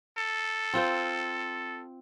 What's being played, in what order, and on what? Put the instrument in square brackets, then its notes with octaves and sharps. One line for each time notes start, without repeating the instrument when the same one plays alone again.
[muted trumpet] A4
[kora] C4 F4 C5